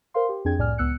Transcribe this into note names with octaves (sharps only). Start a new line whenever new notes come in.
A#4 C5 F5 C6
G4
F2 C4 D4 G#4 G5 G#6
C2 A2 D5 G#5 F6
C#2 B3 E6 F#6 C#7